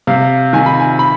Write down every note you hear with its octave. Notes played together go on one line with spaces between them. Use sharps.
C3 F5
D#3 G#5
B5
G#5
B5